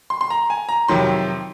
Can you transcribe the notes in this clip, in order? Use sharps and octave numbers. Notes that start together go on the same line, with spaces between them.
C6
C6
A#5
G#5
A#5
F2 C3 D#3 F#3 C6